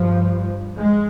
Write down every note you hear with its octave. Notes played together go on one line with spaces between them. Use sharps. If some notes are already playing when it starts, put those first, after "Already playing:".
Already playing: G2 F3
G#3